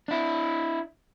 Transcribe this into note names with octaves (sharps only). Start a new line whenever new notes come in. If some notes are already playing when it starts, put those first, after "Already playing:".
D4 E4